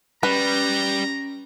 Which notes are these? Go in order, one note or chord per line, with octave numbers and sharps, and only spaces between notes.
G3 C#4 B4 A#5